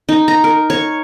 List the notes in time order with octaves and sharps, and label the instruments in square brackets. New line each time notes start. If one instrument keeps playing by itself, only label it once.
[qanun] D#4
A#5
A#4
C#5